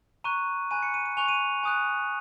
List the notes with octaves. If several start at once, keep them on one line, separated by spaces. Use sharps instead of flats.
A#5 C#6 F#6 D#7
G#5 B5 F#6 D#7
C#7
D#7
D#7
G#5 C#6 F#6 F7
D#7
G#5 D#6 F#6